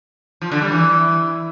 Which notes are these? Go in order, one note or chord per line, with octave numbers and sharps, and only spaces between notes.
F3
D3
G3
E3